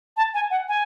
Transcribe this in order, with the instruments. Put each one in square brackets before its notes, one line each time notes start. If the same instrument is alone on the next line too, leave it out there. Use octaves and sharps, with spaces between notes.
[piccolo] A5
G#5
F#5
G#5